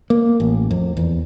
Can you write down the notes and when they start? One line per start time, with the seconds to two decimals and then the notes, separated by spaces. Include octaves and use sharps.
0.10 A#3
0.40 A1
0.71 F2
0.97 E2